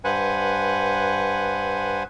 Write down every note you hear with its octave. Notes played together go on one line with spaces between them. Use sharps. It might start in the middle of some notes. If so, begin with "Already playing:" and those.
G2 B4 C5 F#5 G#5